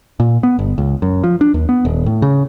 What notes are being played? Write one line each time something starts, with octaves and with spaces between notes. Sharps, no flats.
A#2
B3
G1
C#2
F#2
F3
D4
D#2
B3
D#1
A2
C#3